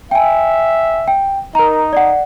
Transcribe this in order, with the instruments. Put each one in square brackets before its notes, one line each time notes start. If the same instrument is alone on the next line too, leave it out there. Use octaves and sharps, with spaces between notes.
[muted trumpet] E5 [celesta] G5 G#5
[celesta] G5
[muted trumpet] D#4 [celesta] A#4 A#5
[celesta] D5 F#5